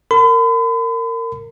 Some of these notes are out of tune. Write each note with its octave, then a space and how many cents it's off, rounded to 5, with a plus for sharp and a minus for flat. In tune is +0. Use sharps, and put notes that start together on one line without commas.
A#4 -25 B5 +40